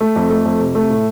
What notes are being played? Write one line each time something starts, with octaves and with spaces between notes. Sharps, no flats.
A3
F2
A3
F2
C3
A3
A2